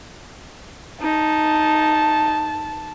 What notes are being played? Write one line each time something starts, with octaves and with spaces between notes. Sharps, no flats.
D#4 A5